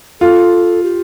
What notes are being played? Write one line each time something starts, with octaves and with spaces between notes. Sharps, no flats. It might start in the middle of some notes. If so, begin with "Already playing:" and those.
F4 A4
G4